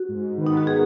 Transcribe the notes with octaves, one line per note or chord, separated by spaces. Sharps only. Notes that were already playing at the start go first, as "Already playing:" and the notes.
Already playing: F#4
G#2
D#3 B3
D#4
F#4
G#4